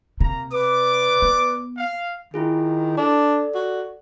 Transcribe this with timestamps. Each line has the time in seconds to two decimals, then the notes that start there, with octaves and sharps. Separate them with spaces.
0.20 C3 A#3 A#5
0.52 B4 D5 D6
1.22 B3
1.77 F5
2.34 D#3 E4 F4 G#4
2.97 D4 A4 D5
3.54 F#4